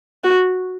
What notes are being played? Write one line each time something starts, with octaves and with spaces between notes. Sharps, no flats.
F#4